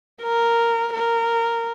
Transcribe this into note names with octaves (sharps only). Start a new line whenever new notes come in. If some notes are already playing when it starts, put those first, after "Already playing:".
A#4
A#4